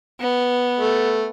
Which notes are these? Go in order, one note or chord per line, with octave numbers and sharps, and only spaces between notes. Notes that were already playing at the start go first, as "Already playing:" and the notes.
B3
A3